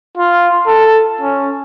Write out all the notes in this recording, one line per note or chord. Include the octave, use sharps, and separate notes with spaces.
F4
A4
C#4